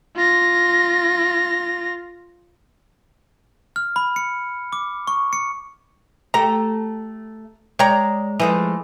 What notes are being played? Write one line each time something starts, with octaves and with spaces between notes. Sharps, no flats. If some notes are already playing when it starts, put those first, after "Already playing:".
F4 A#6
F6
B5
C#7
D6
C#6
C#7
A3 G4 A4 A#5
G#3 C#5 D5 G5 A#5
E3 F3 G#3 A3